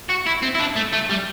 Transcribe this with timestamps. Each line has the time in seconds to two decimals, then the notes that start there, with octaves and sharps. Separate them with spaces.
0.09 F#4
0.26 E4
0.42 C4
0.55 E4
0.60 D4
0.76 A3
0.93 A3
1.09 G3